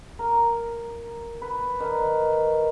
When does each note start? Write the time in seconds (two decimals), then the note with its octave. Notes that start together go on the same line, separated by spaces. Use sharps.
0.19 A#4
1.42 B4
1.80 D#3